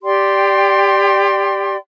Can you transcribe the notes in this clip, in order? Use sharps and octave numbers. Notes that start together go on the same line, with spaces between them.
G4 D5 G5 C6